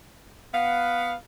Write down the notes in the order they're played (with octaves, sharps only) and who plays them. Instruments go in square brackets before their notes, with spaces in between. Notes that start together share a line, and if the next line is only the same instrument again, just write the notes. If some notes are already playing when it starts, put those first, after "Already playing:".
[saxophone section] B3 F5